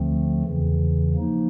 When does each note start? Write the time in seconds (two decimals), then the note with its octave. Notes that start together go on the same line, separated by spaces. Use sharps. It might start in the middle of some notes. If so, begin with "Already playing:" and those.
Already playing: D2 D3 F3 A3 C4
0.44 E2 C#3 E3
1.14 F3 A#3 D#4